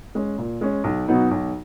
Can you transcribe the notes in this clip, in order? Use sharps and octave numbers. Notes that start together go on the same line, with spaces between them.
G#3 C#4
A#2
G#3 C#4
B1
B2 F#3 B3 D#4
B1